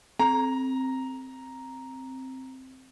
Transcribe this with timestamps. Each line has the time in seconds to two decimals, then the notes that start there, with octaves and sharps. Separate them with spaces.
0.19 C4 A#5